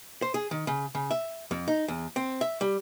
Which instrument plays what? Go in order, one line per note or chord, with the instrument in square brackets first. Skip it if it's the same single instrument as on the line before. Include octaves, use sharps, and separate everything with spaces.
[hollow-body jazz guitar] C5
G#4
D#3
C#3
C#3
E5
F2
D#4
E2
C4
E5
G3